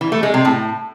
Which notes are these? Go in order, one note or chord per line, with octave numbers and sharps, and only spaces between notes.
E3
A3
G#3
C3
A2